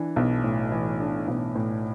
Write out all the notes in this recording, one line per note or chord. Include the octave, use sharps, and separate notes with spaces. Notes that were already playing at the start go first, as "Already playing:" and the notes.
Already playing: E3 D4
B1
A2
E3
D4
B1
A2